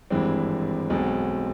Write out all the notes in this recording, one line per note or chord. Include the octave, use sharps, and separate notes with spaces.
G#1 G2 E3 G#3 C4
B1 B2 G#3 C4